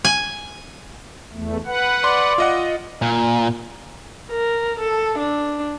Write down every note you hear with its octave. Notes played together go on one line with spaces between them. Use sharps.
G#5
E2 A3
B4 F#5
D5 C6
F4 D#5 F#5
A#2
A#4
A4
D4